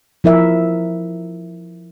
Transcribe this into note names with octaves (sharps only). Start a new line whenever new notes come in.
F3 E4 A#4 E5